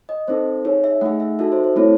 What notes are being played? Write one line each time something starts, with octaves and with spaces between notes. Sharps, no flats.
D#5
C4 D#4 A4 C5
D#4 G#4 C#5
E5
A3 D#4 G#4 F#5
E5
D#4 F#4 A4 E5
C5
C5
A3 C4 E4 A4 C#5